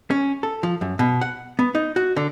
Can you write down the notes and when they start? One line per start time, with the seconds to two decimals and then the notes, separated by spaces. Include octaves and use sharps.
0.11 C#4
0.43 A4
0.63 F3
0.81 F#2
0.99 B2
1.21 F#5
1.59 B3
1.75 D#4
1.96 F#4
2.16 D3